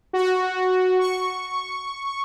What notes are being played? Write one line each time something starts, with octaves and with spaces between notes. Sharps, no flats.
F#4
C#6